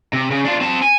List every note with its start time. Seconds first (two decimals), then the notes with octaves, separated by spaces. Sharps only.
0.13 C3
0.31 C#3
0.45 D4 F4
0.61 C4 A5
0.82 G#5